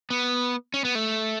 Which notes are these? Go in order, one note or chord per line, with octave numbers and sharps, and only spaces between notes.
B3
C#4
B3
A3